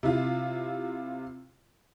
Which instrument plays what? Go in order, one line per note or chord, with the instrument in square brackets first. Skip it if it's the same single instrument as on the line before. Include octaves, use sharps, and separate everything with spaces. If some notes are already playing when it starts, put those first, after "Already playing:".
[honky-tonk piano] C3 E4 F4